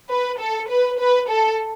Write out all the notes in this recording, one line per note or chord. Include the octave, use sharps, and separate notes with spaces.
B4
A4
B4
B4
A4